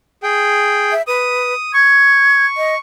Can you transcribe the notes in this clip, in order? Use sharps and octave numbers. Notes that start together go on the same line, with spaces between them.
G#4 G5
E5
B4 D#6
C#6 G#6
D#5